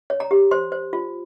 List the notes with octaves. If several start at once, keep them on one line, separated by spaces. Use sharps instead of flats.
C#5
A#5
G4
C5 C6
C5
F4